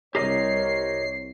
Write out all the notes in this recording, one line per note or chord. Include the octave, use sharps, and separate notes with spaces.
C2 G4 A#4 C#5 D#5 C7